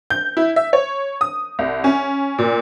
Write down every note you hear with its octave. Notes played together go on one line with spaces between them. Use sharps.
G6
E4
E5
C#5
D#6
C2
C#4
A#2